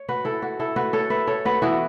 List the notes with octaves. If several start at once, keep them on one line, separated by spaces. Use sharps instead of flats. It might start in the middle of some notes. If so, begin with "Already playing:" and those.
Already playing: C#5
F#4 B4
E4 A4
F#4
E4 A4
F#4 B4
A4 C#5
B4 E5
A4 C#5
F#4 B4
E3 B3 E4 F#4